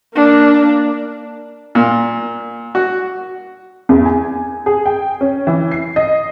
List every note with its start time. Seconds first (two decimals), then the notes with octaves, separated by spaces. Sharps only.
0.14 A#3 D4
1.75 A#2
2.75 F#4
3.89 E2
4.05 G#5
4.66 G#4
4.86 G5
5.21 C#4
5.47 E3
5.71 C7
5.96 D#5